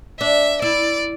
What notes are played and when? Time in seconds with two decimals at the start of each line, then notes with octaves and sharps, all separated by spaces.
0.20 D4 E5
0.62 E4 D5